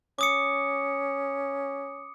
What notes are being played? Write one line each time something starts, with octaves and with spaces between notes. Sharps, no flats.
C#4 D6 D#6 C#7